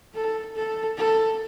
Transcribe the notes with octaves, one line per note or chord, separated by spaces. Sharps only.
A4
A4
A4